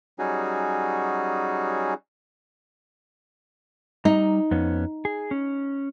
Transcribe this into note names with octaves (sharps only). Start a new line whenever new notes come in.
F#3 G3 C#4 D#4 F#4 G#4
G3 D#4 A#5
F2 B3 C#4
G#4
C#4